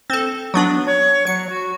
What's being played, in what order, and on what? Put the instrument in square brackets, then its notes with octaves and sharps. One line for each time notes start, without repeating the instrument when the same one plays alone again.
[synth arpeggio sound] C4 A4
F#3 B3 D4
[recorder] C#5
[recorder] F#3 [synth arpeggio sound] C#7
[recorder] F#4